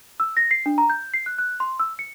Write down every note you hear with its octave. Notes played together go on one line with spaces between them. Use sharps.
E6
A#6
C7
D4
A#5
G6
C7
F#6
F#6
C6
E6
C#7